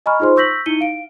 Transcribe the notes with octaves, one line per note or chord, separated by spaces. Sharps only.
D#5 G#5 A#5 B5 C#6 F6
D#4 F4 G#4 C5 C6
C#6 E6 G6 A#6 B6 F#7
D#4 E4 C#7 D#7 G7
F5 D7